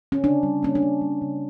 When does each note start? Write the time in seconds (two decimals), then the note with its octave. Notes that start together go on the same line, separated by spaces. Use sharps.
0.12 C#4
0.24 C#3 D4
0.43 G3
0.63 A#3 C#4
0.75 D4
0.82 A#3
1.01 G3
1.22 C#3